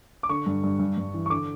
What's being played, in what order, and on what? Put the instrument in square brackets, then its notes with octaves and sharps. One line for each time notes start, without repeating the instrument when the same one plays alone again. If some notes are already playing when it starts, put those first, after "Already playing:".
[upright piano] D6
D3 C#6
G2
G2
G2
G2
E3
C#6
D3 D6